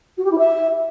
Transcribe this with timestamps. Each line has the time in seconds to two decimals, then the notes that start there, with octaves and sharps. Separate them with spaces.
0.17 F#4
0.24 G4
0.31 E4
0.38 E5